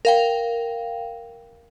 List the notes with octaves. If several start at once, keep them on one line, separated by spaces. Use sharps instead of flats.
A#4 F5 G5